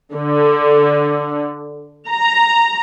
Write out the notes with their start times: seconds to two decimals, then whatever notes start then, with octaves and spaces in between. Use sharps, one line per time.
0.13 D3
2.09 A#5